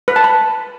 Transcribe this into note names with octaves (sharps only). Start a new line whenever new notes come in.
B4
A5
B5